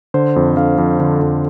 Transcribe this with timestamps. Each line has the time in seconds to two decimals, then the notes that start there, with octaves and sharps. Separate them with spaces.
0.14 D3 C5
0.36 F2
0.57 D3 F5
0.78 F2
1.00 D3
1.22 F2